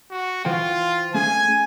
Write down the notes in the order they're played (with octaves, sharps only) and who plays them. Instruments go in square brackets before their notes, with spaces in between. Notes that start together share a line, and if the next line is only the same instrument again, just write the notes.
[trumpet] F#4
[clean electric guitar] E3 C5 G5 [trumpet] F4
[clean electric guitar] A3 C#4 G#4 [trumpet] G#5